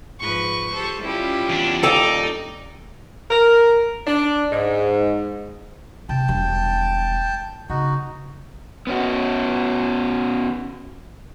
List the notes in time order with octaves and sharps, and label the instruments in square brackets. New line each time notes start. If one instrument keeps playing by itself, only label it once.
[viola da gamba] G#2 F3 B4 [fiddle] C#6
[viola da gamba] G4 A4 C5
[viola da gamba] G3 C#4 F4 [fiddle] E4 G4
[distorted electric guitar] E2 D4
[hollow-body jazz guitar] D#2 A4 G5 [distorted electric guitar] D#4 [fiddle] D5
[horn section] A#4
D4
G#2
[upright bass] C3 [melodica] G5 A5
[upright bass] E1 G3
[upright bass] C#3 [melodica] D#4 F#4
[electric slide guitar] B3 C#4 F#4